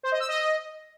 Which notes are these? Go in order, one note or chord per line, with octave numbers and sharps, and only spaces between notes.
C5
D#5
E6
D#5